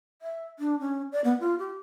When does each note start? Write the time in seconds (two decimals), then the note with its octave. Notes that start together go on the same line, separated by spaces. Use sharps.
0.22 E5
0.59 D4
0.80 C#4
1.12 D5
1.24 B3
1.40 F4
1.59 G4